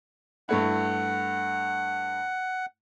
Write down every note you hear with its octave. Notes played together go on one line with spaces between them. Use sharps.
G2 A3 E4 F#5